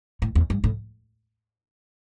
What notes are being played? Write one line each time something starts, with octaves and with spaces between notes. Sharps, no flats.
A2
E2
G2
A2